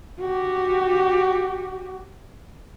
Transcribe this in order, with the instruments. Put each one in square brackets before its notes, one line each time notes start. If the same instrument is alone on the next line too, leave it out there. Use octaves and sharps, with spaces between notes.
[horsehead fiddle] F#4 G4